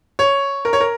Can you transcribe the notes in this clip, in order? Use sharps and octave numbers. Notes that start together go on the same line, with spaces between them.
C#5
A#4
C#5
A#4